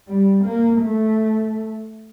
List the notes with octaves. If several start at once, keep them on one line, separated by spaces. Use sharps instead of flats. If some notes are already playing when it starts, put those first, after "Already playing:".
G3
A#3
A3